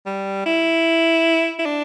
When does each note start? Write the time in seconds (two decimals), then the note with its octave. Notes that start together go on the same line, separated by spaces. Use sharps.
0.06 G3
0.46 E4
1.59 E4
1.65 D4